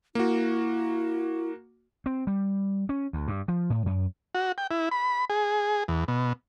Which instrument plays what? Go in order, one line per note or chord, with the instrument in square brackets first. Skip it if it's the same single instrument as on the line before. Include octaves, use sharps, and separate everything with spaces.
[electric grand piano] A#3 F#4 [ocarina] E4
[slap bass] C4
G3
C#4
D2
G2
F3
A2
F#2
[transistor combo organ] F#4
G5
E4
B5
G#4
E2
B2